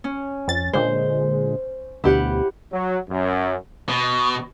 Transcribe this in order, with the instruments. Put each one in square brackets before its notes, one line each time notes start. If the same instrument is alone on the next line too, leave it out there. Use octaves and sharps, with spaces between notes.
[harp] C#4
[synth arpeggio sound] F2 A6
[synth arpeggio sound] A#2 D3 G#3 [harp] C5
[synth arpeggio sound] D2 B2 D3 [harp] E4 G4 F#5
[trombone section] F#3
F#2
[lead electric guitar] B2